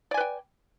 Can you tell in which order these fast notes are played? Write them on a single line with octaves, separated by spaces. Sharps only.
D5 G#5 B4 G5